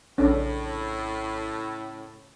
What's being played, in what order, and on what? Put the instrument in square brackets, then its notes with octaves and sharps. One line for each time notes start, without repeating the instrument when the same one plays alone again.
[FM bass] A#1 [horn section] A2 [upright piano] C#3 [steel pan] C#4 D4 A4